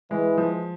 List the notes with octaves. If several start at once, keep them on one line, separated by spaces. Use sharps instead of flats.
E3 G#3
F3